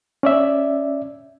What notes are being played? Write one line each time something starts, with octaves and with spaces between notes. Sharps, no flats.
C#4 D5 E5